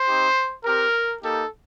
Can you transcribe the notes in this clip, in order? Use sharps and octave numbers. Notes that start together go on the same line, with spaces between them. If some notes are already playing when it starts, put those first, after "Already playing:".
Already playing: C5
C4 D#4 G4
C4 G4 A#4
A#3 D#4 G4 A4